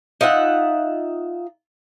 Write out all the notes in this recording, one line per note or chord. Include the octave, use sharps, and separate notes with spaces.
D#4 F4 E5 F#5